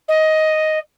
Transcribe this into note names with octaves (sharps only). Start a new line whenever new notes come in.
D#5